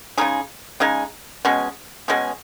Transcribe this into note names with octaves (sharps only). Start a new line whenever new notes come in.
C#3 G#3 D#4 G#4
C#3 G#3 D#4 G#4
B2 G#3 C#4 G#4
B2 G#3 C#4 G#4